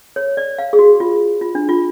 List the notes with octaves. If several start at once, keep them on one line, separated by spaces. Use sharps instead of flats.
C#5
D5
F5
G#4
F#4
F4
F4
D4
F4